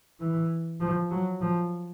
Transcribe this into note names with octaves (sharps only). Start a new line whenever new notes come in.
E3
F3
F#3
F3